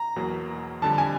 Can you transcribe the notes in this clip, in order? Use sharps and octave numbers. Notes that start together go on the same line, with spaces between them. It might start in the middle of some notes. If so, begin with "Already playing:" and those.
Already playing: A#5
E2 B2 F#3 A#3
F2 D3 G3 A5
G#5